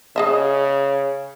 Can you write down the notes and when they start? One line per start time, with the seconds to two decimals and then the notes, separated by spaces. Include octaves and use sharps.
0.16 C#3 G#4 D#5 E5